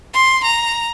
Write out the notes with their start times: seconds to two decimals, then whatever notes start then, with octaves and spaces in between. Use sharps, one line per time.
0.14 C6
0.44 A#5